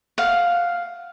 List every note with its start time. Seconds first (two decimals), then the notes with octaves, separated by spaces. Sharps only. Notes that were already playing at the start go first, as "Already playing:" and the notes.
0.18 F5 F#5